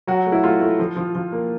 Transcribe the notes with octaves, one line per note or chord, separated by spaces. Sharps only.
F#3 F#4
A3
E4
A3 F4
A3
F3
F3
F3
A#3